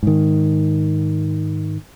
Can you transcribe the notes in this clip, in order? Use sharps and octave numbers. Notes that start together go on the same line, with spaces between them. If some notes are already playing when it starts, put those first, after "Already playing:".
G#2 D#3